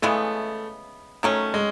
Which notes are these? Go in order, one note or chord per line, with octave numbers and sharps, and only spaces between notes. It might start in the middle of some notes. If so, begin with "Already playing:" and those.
C#3 E3 G#3 A3 B3
D#3 F#3 A3 C#4
G#3